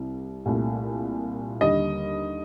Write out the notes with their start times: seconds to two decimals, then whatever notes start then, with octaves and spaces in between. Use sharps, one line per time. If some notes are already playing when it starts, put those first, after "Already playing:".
Already playing: C2 C3
0.46 C2 A#2 A3
1.61 D#2 D3 G3 D#5